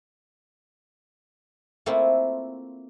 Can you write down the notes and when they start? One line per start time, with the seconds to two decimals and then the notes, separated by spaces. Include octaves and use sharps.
1.86 A3 A#3 C4 E4 F4